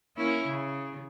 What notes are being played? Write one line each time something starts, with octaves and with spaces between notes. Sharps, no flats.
A#3 C#4 E4
C#3